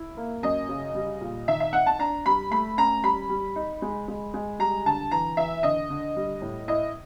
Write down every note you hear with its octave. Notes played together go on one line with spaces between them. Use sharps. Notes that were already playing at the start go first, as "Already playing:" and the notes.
Already playing: E4
A#3
F#2 D#5
C#3
G3
A#2
D#3 E5
E5
D#4 F#5
A5
D4 A#5
G3 B5
A3 B5
C#4 A#5
G3 B5
G3
D#4
G#3
G#3
G#3
G3 A#5
D3 A5
E3 A#5
E3 E5
D3 D#5
D3
G3
A2
E4 D#5